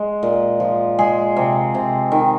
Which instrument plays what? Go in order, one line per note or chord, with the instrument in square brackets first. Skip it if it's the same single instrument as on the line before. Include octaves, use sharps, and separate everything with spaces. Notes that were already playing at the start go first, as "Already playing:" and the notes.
Already playing: [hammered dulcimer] G#3
A#2
F3
G#3 G#4
C3
C3
D#3